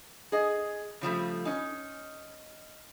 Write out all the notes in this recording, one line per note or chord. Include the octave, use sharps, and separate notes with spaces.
G#4 D#5
C#3 F3 G3 A3
C#4 D#4